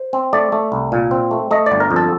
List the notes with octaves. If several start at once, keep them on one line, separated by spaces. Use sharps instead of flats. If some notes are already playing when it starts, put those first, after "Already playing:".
Already playing: C5
C4
A3 D5
A3
C2
A#2
C4
A3
A3 D#5
D5
G1
A#4
F2
A4